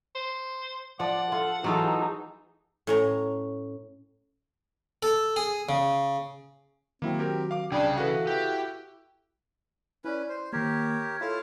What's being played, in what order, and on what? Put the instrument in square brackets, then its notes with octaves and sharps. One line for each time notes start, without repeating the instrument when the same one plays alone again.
[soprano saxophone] C5
[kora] F3 [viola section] D5 [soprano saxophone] F#5
[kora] F4 [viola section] A4
[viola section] E3 D#4 G#4 [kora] F#3 F4 A4
[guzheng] A2 C#4 A#5
[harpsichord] A4
G#4
C#3
[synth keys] D#3 F#3 F#4 [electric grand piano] A#3 E4 [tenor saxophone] C4
[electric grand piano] G4 A#4
F5 D6
[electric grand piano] C2 [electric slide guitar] C#3 G#4 [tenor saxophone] D4 [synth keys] G5 B5
[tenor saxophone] E3 [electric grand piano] F#4 B4 [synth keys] A4 F5 F#6
[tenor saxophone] E4 [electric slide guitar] G4
[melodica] C#4 B4 [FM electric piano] E4 D5
[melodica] C5
[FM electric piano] D#3 A#3 [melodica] G4 A#4 C#5
[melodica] E4 F4 [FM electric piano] A4 C#5 F5